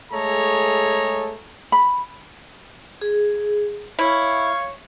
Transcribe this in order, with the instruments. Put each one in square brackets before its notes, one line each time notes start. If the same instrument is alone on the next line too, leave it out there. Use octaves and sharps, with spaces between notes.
[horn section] G#3 A3 G#4 A4 C#5 A#5
[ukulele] B5
[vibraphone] G#4
[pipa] E4 [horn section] C#5 F5